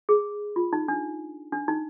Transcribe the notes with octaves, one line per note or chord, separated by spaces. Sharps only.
G#4
F4
D#4
D4
D4
D#4